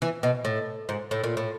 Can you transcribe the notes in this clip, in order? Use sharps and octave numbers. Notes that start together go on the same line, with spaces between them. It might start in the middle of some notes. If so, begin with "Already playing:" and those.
E3
B2
A2
G#2
A2
A#2
A2